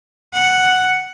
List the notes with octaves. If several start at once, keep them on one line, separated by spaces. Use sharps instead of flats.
F#5